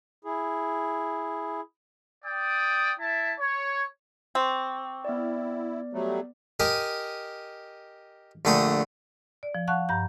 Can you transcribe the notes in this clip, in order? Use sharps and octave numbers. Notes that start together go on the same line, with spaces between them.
E4 G#4
D5 G5 D#6
E4 E5 A5
C#5
C4 C#6 D6
B3 E4 D5
F#3 G3 A3
G4 A#4 D#5 G#5
A#1 D3 A3 G5 A#5 D#6
D5
F3
F5 F#5 A5 C#6 F#6
G2 A#5 G6